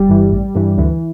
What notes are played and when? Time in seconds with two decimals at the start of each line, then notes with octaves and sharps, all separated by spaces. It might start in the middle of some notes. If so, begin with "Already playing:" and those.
Already playing: G1 G3
0.09 G2 E3
0.32 A1
0.55 G2 E3
0.78 D2 E3